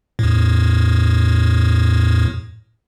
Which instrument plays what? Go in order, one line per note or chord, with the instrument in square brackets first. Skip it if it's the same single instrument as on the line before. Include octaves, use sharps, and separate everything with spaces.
[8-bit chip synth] E2 A2